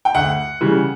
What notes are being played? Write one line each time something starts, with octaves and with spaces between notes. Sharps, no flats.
G5
D2 F#5
C#3 E3 G3